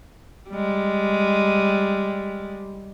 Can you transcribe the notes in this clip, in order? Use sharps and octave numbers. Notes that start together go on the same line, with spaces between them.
G3 G#3